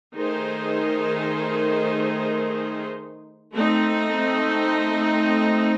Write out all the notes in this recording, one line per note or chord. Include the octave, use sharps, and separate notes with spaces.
D#3 A3 D#4 G#4 C5
A3 C4 D#4